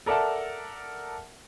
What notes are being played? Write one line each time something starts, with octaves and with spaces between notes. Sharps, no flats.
A4 A#4 D5 E5 F#5 A5